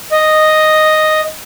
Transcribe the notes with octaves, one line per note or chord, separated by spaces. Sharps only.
D#5